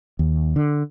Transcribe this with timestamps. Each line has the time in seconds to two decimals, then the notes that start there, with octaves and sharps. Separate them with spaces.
0.19 D#2
0.56 D3